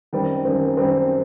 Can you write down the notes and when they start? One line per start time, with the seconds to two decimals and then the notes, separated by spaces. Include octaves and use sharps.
0.13 F#2 D#3 G3 C4
0.45 F#2 D#3 G3 C4
0.77 F#2 D#3 G3 C4